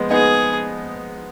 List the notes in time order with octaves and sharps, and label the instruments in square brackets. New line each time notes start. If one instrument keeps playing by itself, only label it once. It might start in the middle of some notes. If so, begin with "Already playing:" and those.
Already playing: [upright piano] F3 G#3 B3
[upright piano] B3 D#4 [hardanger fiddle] G#4